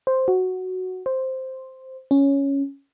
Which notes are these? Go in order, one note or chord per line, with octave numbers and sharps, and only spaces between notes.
C5
F#4
C5
C#4